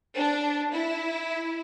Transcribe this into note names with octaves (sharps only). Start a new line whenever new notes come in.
D4
E4